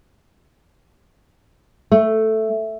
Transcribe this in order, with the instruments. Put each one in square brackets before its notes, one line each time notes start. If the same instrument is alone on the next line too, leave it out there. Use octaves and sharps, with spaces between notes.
[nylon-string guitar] A3